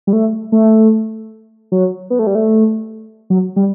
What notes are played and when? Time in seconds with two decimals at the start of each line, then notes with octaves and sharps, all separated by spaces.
0.07 G3
0.13 A3
0.52 A3
1.72 F#3
2.10 B3
2.19 A3
2.27 G3
2.35 A3
3.30 F#3
3.56 G3